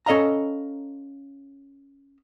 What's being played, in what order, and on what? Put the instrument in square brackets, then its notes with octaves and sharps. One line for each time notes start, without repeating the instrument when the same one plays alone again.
[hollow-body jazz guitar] C#4 A4 D#5 F5 A#5